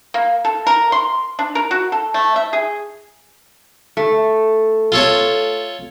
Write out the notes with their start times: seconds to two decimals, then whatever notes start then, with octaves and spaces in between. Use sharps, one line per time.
0.14 A#3
0.45 A4
0.67 A#4
0.92 C6
1.39 D4
1.55 A#4
1.71 F#4
1.92 A4
2.14 A3
2.36 E5
2.53 G#4
3.97 A3
4.92 F4 A4 C#5